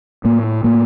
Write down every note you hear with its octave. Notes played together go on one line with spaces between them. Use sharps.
A2 A#3
A2 A#3